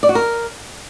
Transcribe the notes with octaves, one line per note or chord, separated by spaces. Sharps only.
D5
F#4
A#4